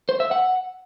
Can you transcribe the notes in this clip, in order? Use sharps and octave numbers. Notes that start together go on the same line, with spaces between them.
C5
E5
F#5